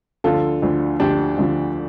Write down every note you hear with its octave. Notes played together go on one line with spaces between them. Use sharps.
D2 D3 F3 F4 A4
D2 D3 F3
D2 D3 F3 D4 G4
D2 D3 F3